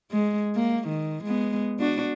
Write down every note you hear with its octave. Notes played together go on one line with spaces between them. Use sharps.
G#3
A#3
D#3
G#3 B3
B3 D4 F#4